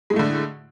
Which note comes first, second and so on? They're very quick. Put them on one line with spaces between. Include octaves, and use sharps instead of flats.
G#3 A2 A3 D3